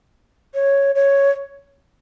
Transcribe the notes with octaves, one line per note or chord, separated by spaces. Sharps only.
C#5
C#5